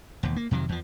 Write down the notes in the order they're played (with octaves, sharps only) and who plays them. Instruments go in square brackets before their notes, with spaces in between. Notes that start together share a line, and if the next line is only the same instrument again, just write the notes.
[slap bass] E1 D#2
A#3
F2 C3 D#3 F#3
E2 F3